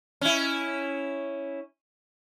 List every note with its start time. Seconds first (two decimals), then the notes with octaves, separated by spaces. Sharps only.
0.21 C#4 E4